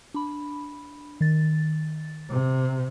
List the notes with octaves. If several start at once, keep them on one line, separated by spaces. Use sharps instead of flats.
D4 B5
D#3 A6
C3